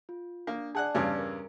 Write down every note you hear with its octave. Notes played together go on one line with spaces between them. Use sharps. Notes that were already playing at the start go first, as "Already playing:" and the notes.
F4
A#3 D4
G#4 D5 F#5 A5 F#6
E2 G2 C#3 B4 E6 G#6
A#4